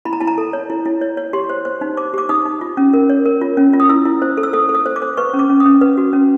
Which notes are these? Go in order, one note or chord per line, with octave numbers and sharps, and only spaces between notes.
E4 B5
A#5
E4 A5
A#5
A4
C#5
E4
E4
C#5
C#5
G4 C6
C5
C5
D#4
C5 D6
G4 D6
D#4 D#6
D#4
F4
C#4
A#4
C#5
A#4
F4
C#4
F4
D#6
E4 E6
E4
C5
A4
E6
A4 D#6
A4
D#6
C5
D6
C5
B4 C#6
C#4
D6
C#4
D#6
C#4
B4
F#4
C#4